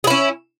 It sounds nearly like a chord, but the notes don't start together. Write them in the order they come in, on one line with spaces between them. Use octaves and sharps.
G#4 E4 C#4